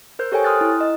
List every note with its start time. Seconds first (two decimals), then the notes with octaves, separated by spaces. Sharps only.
0.19 A#4 C5 G6
0.32 G4 A4 C#5 G5 G#5
0.44 C6 D#6 F6 F#6 A6
0.61 E4
0.81 D#5